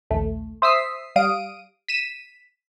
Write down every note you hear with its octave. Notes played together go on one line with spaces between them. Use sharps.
A#1 D#2 A3
C5 E5 D#6 E6 B6 C7
G3 F5 D#6 D7 D#7
B6 D#7 E7